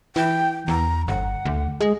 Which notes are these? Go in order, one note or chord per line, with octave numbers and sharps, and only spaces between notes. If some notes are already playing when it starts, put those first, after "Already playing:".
E3 G5
E2 A#5
G1 F#5
D2
G#3